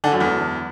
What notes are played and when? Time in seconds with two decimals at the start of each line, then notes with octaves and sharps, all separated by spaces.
0.04 D3
0.12 F#2
0.20 E2